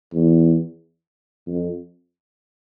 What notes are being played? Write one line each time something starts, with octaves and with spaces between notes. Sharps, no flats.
E2
F2